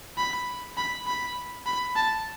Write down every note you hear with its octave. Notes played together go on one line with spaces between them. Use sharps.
B5
B5
B5
B5
A5